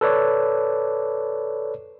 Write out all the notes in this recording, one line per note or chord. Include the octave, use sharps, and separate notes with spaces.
A4 B4 C#5 D5